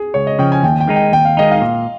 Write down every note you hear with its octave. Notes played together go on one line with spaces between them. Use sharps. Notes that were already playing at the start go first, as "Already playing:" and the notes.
Already playing: G#4
C#2 C#5
D#5
C#3 F3 G5
G#5
D#2 G5
G5
D#3 G#3 D#4
G5
D#2 G5
F5
D#3 G#3 D#4 D#5
F5
A#2